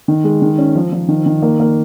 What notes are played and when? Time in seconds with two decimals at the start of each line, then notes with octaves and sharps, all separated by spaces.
0.08 D#3
0.24 G#3
0.42 D#3
0.58 C#4
0.76 F3
0.92 F3
1.08 D#3
1.26 D#3
1.42 A#3
1.60 A#3